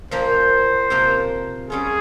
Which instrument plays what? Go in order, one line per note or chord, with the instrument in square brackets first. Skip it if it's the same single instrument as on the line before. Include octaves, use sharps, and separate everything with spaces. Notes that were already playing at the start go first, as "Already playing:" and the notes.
[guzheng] A#2 F3 A#3 [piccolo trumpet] C5
[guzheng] C3 F3 A#3 F4
[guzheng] G3 C#4 F4 [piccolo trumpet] G#4